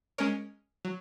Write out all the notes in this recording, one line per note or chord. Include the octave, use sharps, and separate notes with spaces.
G#3 C#4 A#4 C#5
F#3